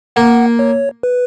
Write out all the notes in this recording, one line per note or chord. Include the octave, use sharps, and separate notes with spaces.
A#3 F#5
C#5
B4